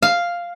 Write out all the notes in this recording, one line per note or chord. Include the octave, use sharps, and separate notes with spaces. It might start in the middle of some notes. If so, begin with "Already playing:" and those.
F5